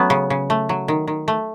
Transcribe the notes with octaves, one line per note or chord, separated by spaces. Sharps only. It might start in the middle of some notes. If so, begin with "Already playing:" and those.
Already playing: F#3 A3 B3 C#4
C#3
C#3
A3
F#3
D#3
D#3
A3